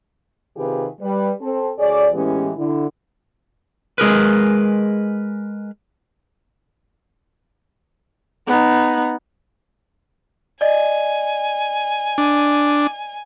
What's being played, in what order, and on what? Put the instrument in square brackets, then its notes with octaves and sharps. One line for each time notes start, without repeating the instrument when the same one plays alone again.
[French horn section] C3 D#3 F4 G4 G#4 B4
G3 B4
C4 A4
D2 G#4 C#5 D5
A2 E3 G#3 B3 C#4 G4
D3 E4
[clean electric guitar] G#3 G#4 A#4 B4
[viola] B3 D#4
[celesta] D5 D#5 [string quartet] G#5
[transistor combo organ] D4